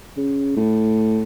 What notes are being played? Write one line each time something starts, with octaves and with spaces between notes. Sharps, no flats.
C#3
A2